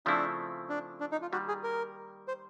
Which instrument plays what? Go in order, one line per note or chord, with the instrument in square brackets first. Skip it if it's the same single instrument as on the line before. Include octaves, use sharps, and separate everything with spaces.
[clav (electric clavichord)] C#3 F3 A3 C4 E4 [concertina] D4
[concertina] D4
D4
D#4
F4
[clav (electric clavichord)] D#3 G3 A#3 [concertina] F#4
[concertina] G#4
A#4
C5